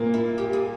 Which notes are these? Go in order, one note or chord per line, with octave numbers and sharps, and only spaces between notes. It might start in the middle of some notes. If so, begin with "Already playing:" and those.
Already playing: A#2 A#3
E4
G4
G#4